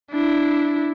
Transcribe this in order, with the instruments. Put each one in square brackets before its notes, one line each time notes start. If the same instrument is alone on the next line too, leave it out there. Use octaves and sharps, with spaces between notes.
[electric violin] D4 E4